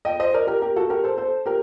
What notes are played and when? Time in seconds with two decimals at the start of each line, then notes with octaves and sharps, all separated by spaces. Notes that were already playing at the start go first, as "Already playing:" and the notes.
0.05 D#5 G5
0.20 C5 D#5
0.34 A#4 D5
0.47 G4 A#4
0.62 G4 A#4
0.76 F#4 A4
0.90 G4 A#4
1.04 A4 C5
1.18 A4 C5
1.46 G4 A#4